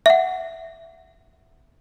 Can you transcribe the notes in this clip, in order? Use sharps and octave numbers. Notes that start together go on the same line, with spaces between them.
E5 F#5